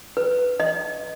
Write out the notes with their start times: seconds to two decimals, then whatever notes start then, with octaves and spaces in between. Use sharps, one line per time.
0.17 B4
0.60 D#5